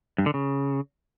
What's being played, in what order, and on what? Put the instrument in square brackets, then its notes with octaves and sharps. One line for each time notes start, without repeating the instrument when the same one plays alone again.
[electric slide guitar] G2
D3
C#3